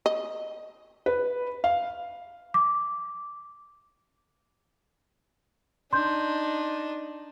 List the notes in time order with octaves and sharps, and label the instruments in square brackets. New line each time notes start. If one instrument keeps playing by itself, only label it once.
[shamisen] D#5
[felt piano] B4
F5
[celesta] D6
[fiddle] D4 D#4 [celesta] C6 G6